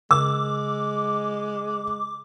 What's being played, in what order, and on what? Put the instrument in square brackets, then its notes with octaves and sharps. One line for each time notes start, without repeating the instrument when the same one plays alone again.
[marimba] C#3 [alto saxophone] G#3 [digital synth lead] D6 [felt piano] E6